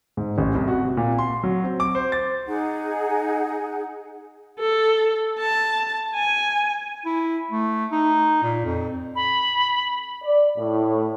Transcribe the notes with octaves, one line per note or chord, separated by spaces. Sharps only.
G#2
A1
C2
F#4
C3
A#2
C6
F#3
C4
D6
C5
A6
D#4 G#4 F#5
A4
A5
G#5
E4
A3
D#4
A#2
F2
B5
D5
A2